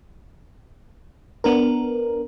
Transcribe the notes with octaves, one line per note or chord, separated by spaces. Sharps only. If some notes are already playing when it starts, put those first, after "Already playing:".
B3 D4 A#4